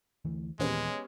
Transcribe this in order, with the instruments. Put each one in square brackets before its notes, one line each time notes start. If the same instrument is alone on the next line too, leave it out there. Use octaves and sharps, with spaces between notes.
[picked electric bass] D2 E3 A3
[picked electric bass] D#2 A#2 E3 [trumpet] G#3 [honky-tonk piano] B3 C#4 G4